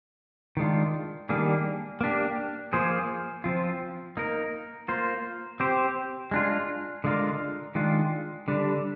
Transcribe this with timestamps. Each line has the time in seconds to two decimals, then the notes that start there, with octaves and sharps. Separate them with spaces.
0.57 D#3 G#3 D4 F4
1.29 D#3 G3 A#3 D4 G#4
2.01 A#3 D4 G4
2.73 F3 A#3 F4 G#4 C5
3.44 F3 C4 F4
4.17 A#3 D#4 A#4
4.88 A#3 F4 C5
5.60 C4 G4 C5
6.31 G#3 D4 F4
7.04 D3 G#3 D4 F4 A#4
7.75 D#3 G#3 D4 F4
8.48 D3 G3 D4